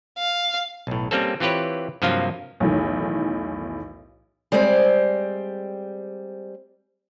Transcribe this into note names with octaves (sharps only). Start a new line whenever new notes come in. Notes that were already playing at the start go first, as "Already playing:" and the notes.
F5
B1 A2
G3 A#3 C4 C#4 A4
E3 C4 F4 G4 B4 C#5
G2 C3 F3 F#3 A#3 F4
B1 E2 A2 D#3
G3 G#3 C4 C5 D5